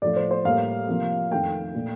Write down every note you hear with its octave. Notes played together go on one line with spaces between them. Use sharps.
A2 F3 A3 D5
C5
C5
A2 G3 A#3 F5
C3 F3 A#3
F2 D#3 A3 G5
A#2 A3